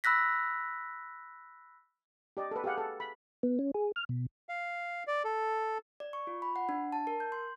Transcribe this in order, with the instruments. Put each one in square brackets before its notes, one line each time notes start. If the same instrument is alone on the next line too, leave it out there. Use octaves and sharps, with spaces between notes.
[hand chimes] B5 E6 F#6 A#6 B6
[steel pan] G4 D5 D#5
A4 B4
G4 G#4 F5 F#5
A4
B5
[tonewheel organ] B3
C#4
G#4
F6
B2
[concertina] F5
D5
A4
[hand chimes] D5
C#6
F4
B5
F#5
D4
A5
A#4
G6
C6